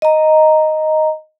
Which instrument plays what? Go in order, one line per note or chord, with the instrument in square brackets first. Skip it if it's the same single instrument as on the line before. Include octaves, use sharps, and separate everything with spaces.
[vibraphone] D#5 A#5